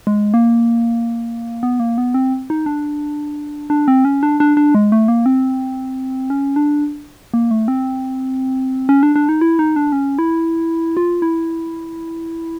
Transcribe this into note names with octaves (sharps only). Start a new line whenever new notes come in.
G#3
A#3
B3
A#3
B3
C4
D#4
D4
D4
C4
C#4
D4
D4
D4
G#3
A3
A#3
C4
C#4
D4
A#3
A3
C4
C#4
D4
D4
D#4
E4
D#4
D4
C#4
E4
F4
E4